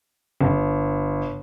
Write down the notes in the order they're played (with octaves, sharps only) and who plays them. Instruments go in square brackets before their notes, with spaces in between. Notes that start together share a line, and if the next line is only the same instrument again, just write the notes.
[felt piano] G1